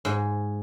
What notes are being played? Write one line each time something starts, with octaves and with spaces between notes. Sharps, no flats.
G#2